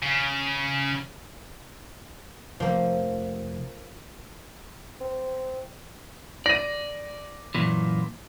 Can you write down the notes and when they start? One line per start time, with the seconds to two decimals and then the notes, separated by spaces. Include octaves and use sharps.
0.03 C#3
2.60 F1 F3 A3 A#3
5.00 C4
6.46 D5 A#6 D#7
7.54 F#2 A#2 E3